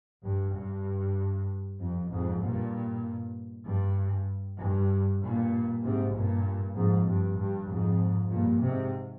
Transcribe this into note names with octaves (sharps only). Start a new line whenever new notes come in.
G2
G2
F2
F2 G#2
G2 A#2
G2
G2
G2 A#2
G#2 C3
G2 A#2
F2 G#2
G2
G2
F2 G#2
G2 A#2
G#2 C3